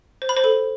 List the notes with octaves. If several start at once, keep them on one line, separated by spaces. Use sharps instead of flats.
C5
B5
C5
A4